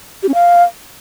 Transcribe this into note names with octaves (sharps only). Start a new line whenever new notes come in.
G4
C#4
F5